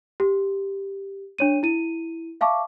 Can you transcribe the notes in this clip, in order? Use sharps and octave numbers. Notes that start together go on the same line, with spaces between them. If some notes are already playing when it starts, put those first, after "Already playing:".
G4
D4 C#5 D#7
E4 D#7
E5 F5 A5 C#6 D6